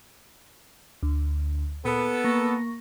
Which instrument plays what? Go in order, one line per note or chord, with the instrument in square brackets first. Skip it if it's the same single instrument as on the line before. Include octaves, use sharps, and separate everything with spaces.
[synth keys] D2
[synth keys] A#2 [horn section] B3 A4
[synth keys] A#3 C#6 A#6